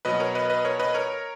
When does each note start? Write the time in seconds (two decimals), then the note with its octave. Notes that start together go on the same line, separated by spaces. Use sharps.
0.05 B2 F#3 B3 B4 D#5
0.20 A#4 C#5
0.35 B4 D#5
0.50 B4 D#5
0.65 A#4 C#5
0.80 B4 D#5
0.94 A#4 C#5